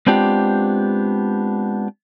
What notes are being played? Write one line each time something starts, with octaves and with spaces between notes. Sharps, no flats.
G#3 B3 C4 D4 F4 G4